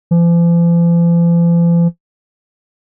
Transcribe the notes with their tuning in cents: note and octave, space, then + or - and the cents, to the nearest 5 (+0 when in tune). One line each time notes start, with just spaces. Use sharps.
F3 -45